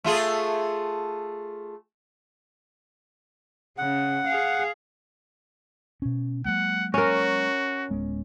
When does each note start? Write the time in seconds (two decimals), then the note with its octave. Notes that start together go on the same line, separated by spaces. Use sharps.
0.04 A3 F4 G#4
3.78 C#3 F#5
4.27 G#4 F5
6.02 B2 C#4
6.45 F#3 G#3 A#3 F#5
6.94 C#4 F#4 A#4
7.91 D1 G#3 B3